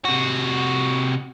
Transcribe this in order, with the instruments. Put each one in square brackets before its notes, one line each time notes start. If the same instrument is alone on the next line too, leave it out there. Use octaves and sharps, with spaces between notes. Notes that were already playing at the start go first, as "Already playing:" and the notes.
[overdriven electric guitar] C3 F#4